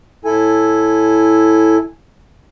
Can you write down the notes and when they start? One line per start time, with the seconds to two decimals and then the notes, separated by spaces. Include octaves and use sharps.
0.25 A2 E4 A4 G#5